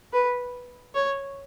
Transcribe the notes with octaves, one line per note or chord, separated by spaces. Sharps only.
B4
C#5